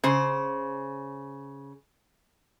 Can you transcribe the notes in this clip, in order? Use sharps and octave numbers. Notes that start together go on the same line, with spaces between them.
C#3 C5